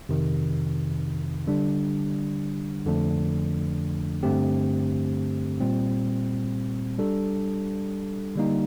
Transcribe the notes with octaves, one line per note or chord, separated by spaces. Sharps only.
F2 C3 D#3
D3 G3 D4
F2 D3 F3 A3 D4
G2 D3 A3 C4 G4
A#2 G3 C4
G3 D4 A4
D3 G3 A#3 D#4